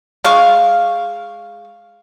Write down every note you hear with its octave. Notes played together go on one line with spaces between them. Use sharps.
G#3 F5 C#6